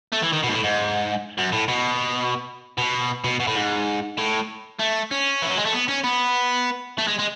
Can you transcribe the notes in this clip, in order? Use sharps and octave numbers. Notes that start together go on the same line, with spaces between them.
A3
E3
D#3
B2
G#2
A2
G#2
F#2
A2
B2
B2
B2
B2
A2
G#2
A2
A3
C#4
E3
F#3
G#3
A3
B3
C#4
B3
A3
G#3
G#3